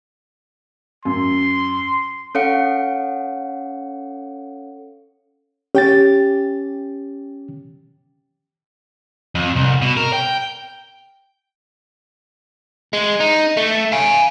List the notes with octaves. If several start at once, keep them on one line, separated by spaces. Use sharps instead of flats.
F#2 C6
C#4 A4 C#5 F5 F#5 C#7
C#4 G4 G5 A6
F2
C2
B2
A#4
G5
G#3
D#4
A3
F5 G#5